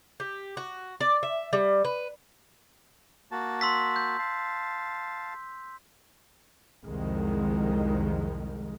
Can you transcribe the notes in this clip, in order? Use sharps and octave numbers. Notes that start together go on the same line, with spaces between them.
G4
F#4
D5
E5
G3
B4
A#3 F#4 A5
C6 E6 B6
G6
F5 A5
C2 F2 D#3 G#3